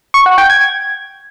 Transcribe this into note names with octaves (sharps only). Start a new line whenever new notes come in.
C#6
F#5
G5
G#6